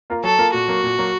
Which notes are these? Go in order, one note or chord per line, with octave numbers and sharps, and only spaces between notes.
A#3 F4 A#4
F#3 A4
A#3 F4 A#4
A#2 F#4
F#3 A#3
A#2
F#3 A#3